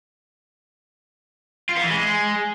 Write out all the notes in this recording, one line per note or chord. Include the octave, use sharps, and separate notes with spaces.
F4
B3
E3
G#3